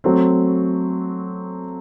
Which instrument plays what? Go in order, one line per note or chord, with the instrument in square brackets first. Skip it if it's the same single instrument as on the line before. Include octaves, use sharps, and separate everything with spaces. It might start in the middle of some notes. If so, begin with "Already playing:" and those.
[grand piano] F#3 A3 C4